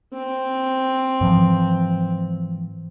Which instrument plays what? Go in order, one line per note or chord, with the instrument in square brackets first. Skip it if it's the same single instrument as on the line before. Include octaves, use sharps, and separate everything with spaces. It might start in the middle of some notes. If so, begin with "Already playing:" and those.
[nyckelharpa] C4
[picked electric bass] G#2 E3 F3